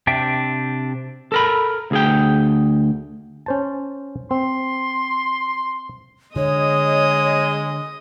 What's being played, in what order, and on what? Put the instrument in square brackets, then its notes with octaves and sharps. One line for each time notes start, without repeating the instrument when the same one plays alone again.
[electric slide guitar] C3 D4 E5 G5
[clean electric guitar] A4 A#4 B5
D2 G#4 G5
[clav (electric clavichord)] C#4 C5 A5
[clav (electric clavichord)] C4 [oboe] C6
[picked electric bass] D3 [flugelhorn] G#3 [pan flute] C#5 [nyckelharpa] D#5 D#6